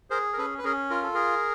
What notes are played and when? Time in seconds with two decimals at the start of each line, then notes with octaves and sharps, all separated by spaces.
0.10 G#4 A#4 C5
0.33 A#4
0.37 C#4 A4 B4
0.58 B4
0.64 C#4 G#4 A#4
0.90 F4 A#4
1.03 A4
1.14 G#4 A#4